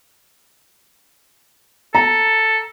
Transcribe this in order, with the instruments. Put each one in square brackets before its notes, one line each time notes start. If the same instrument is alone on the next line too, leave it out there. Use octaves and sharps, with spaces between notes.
[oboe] A4 [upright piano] A#5